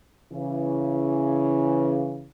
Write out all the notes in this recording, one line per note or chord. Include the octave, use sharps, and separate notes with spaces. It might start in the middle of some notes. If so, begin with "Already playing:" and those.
C#3 E3